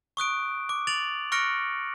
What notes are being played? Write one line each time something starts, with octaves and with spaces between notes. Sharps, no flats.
C#6 D#6 F#6 D7
D6
A6 D7 F7 F#7
C#6 F6 F#6 A#6 C#7 D7